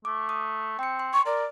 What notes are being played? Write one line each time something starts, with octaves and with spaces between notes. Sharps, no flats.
A3 D6
D#6
C4 G5 C#7
C6
C#6
A#4 D5